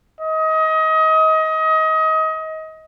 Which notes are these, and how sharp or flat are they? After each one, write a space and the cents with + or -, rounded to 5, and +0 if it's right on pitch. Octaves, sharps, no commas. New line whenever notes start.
D#5 +25